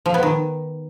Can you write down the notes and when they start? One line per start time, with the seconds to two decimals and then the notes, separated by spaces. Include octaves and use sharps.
0.06 F3
0.14 B3
0.23 D#3